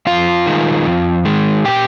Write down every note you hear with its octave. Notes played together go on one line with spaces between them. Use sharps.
F2 F4 F5
D#3 G#3
F2
D#3 G#3
A#2 G4 G5